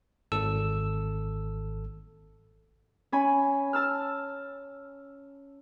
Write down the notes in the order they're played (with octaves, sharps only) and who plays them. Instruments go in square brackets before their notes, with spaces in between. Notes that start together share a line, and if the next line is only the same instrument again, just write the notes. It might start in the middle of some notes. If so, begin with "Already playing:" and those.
[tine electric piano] G#1 A4 E6
[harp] C#4 G#5 B5
A5 E6 F6